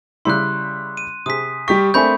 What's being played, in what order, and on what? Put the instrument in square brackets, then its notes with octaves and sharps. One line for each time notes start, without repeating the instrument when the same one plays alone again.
[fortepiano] C#3 G3 E4 [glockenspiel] C6 F#6
[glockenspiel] D#7
[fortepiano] C3 G#4 [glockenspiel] D#6 B6
[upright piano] G3 G4 B6 [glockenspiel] C#6
[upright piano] A3 C4 [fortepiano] A#3 D4 G#5 [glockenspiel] B5 G6